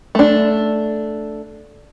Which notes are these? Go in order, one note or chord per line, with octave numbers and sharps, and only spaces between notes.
A3 D4